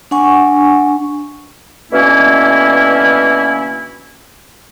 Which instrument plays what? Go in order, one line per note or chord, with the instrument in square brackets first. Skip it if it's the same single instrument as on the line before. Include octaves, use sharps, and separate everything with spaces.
[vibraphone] D4 F#5 G#5 C#6
[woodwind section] B2 D3 E3 A#3 C#4 E4